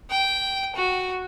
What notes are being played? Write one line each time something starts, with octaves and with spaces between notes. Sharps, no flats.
G5
F#4